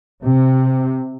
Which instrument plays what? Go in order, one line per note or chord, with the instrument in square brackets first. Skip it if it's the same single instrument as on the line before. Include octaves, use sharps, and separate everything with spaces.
[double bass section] C3